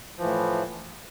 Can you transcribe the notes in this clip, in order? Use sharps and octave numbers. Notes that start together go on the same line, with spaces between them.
A2 E3 F3